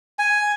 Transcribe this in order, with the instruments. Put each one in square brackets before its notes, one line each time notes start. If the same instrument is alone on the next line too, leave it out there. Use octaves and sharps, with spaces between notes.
[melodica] G#5